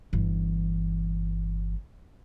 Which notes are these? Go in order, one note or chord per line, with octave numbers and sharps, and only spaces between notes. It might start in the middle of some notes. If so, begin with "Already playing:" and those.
G1 E3